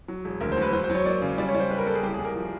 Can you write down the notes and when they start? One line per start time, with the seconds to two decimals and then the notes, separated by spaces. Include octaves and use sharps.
0.08 F#3
0.25 E1
0.41 D2 A#4
0.52 C5
0.57 F#3 B4
0.73 F#3 C5
0.84 C5
0.90 F#3
0.95 C#5
1.05 A#3 D5
1.22 C#3
1.38 G3 D5
1.49 C#5
1.54 G3
1.60 C5
1.70 G3 B4
1.78 A#4
1.86 A#3 A4
1.95 G#4
2.03 C2 G4
2.14 G#4
2.19 C2
2.25 A#4
2.35 F3